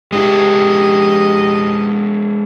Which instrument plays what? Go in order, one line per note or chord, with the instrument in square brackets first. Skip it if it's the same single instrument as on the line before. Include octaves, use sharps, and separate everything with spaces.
[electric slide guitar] G#3 D4 E4 [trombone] G4 [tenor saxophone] D#5